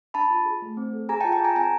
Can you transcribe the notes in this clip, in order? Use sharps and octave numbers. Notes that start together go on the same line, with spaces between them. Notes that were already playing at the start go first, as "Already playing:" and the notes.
D4 A5 B5
F4
G#4
A3
C4
A4
G#4 G#5 A#5
G5 A5
F4
G5 A5
G#4 G#5 A#5
C4 G#5 A#5